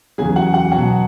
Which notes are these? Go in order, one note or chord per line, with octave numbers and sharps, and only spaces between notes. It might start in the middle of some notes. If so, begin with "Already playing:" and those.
E2 C#3 F#3 G#4 G#5
F#4 F#5
F#4 F#5
B2 F#3 F#4 F#5